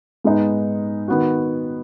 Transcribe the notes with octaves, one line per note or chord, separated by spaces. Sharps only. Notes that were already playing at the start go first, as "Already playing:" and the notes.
G#2 G#3 B3 D#4
D#3 B3 F#4